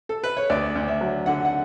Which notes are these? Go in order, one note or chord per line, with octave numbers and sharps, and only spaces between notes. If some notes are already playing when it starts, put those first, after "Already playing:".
A4
B4
C#5
D2 D5
D2
E5
F#3
D3 F#5
F#5